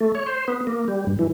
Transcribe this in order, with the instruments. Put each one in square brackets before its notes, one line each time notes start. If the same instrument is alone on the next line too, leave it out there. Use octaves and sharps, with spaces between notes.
[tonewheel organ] A3
C#5
C5
B3
A#3
G3
G2
E3